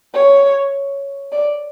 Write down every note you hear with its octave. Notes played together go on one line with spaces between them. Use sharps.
C#5
D5